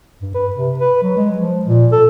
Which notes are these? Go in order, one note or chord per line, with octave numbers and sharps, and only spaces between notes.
G2
B4
C3
B4
F#3
G#3
F3
A#2
A4